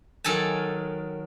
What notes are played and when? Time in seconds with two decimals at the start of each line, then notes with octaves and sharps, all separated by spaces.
0.24 D#3 F#3 A4 G#5 A5